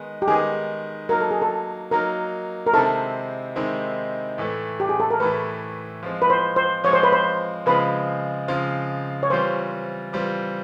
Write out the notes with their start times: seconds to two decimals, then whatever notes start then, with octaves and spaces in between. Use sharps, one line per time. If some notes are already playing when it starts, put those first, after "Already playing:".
Already playing: D#3 G#3 B3
0.22 G4
0.28 D#3 G#3 B3 G#4
1.09 F#3 A#3 D#4 A#4
1.21 A4
1.31 G#4
1.42 A4
1.91 F#3 A#3 D#4 A#4
2.67 A#4
2.74 C3 D#3 G#3 C4 E4 A4
3.56 C3 D#3 G#3 C4 E4
4.38 A2 E3 A3
4.80 G4
4.89 G#4
5.00 A4
5.10 A#4
5.20 A2 E3 A3 B4
6.03 F3 G#3 C4
6.22 B4
6.30 C5
6.56 C5
6.84 F3 G#3 C4 C#5
6.93 C5
7.03 B4
7.13 C5
7.66 C#3 F3 G#3 C4 F4 B4
8.48 C#3 F3 G#3 C4 F4
9.23 C#5
9.30 E3 G3 C4 F4 C5
10.13 E3 G3 C4 F4